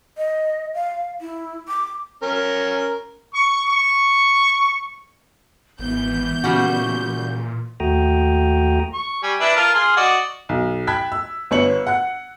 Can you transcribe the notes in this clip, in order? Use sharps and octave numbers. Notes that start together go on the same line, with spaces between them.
D#5
F5
E4
D6
C#4 A#4
C#6
C#6
G#1 E3 B3 G6
A#2 C#3 G3 F#4
D#2 A3 F#4 G5 A#5 D#6
C#6
G3 G#5
D4 E4 B4
F4 A#4 A5
G#4 C6 F6
F#4 D5 D#5
B1
G5 A5 B5 F#6 G#6 B6
E6
G1 B3 C#5 C#7 F#7
F#5 F#6